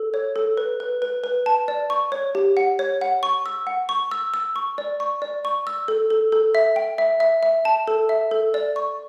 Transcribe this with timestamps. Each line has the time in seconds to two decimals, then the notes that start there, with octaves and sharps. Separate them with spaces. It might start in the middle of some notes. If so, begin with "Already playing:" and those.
Already playing: A4
0.14 C#5
0.36 A4
0.57 B4
0.80 B4
1.02 B4
1.24 B4
1.46 A5
1.68 D5
1.90 C#6
2.12 C#5
2.35 G4
2.57 F#5
2.79 C#5
3.01 F#5
3.23 C#6
3.46 E6
3.67 F#5
3.89 C#6
4.11 E6
4.34 E6
4.56 C#6
4.78 D5
5.00 C#6
5.22 D5
5.45 C#6
5.67 E6
5.88 A4
6.10 A4
6.32 A4
6.55 E5
6.76 G5
6.98 E5
7.20 E5
7.43 E5
7.65 A5
7.87 A4
8.09 E5
8.31 A4
8.54 D5
8.76 C#6